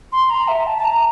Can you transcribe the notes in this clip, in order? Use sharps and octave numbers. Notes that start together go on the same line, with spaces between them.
C6
A#5
E5
A5
A5
A#5